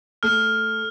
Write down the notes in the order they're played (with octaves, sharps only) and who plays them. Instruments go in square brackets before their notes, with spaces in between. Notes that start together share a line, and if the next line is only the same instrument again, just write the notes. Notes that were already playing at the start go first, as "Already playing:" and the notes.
[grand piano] A3 [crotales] F6